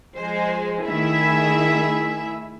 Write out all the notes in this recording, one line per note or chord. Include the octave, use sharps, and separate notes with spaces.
F3 G#3 C5
D#3 A3 E4 G#4 E5